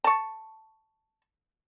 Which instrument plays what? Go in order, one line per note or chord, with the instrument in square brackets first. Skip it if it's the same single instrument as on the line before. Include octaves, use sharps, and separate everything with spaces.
[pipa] A5 C#6